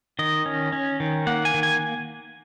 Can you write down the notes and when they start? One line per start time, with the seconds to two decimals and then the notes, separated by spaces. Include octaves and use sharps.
0.19 D#3 D#5
0.46 C#4
0.72 C#4
1.00 D#3
1.27 A#3 F#5
1.45 G#5
1.54 D#3
1.63 G#5